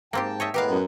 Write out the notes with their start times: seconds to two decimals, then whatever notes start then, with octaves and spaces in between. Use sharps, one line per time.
0.13 G#2 A#3 C4 G4 G5 A5
0.40 C#5 D#5 E5
0.54 A2 G#3 B3 G4 A#4 B4 F5
0.69 F#2